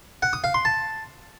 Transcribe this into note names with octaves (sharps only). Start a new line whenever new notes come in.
F#5
D#6
F5
C6
A5